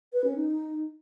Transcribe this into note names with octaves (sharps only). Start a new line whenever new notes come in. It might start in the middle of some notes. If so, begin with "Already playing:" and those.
B4
C#4
D#4